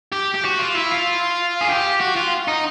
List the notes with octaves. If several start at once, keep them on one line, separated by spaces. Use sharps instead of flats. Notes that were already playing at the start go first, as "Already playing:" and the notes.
G4
G4
F#4
F4
E4
F4
G#4
G4
F#4
F4
D#4